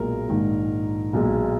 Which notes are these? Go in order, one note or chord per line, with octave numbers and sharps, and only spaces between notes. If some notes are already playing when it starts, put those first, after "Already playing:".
Already playing: B1 A#2 G#3 A#4
A#1 G#2 D#3
B1 A#2 G#3